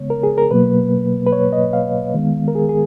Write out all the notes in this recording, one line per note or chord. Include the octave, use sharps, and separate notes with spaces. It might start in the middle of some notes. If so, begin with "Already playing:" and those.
Already playing: C#3 G#3 B3 C#5
A#4
G#4
A#4
B2 F#3 A#3 B4
B4
C#5
D#5
F5
D#3 G#3 B3
A#4
G#4
G#4